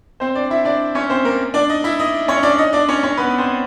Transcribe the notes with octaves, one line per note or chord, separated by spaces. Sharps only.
C4 C5
D4 D5
E4 E5
D4 D5
C#4 C#5
C4 C5
A#3 A#4
D4 D5
D#4 D#5
E4 E5
D#4 D#5
C#4 C#5
D4 D5
D#4 D#5
D4 D5
C#4 C#5
C#4 C#5
B3 B4
C4 C5